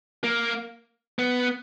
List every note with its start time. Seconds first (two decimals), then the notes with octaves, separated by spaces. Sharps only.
0.24 A#3
1.19 B3